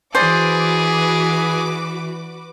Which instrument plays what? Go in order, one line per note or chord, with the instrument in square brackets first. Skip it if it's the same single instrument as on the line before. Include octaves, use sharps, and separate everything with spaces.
[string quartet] E3 [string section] F#4 B4 D6 [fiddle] G#4 [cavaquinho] C5 D5